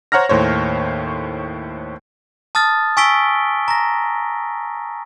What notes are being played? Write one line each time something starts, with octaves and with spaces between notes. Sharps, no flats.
C5 C#5 F#5 A#5 F6 A#6
D#2 A2 C5 C#5
A5 D#6 F6 A6
G#5 C#6 E6 B6 D7 G7
A#5 A#6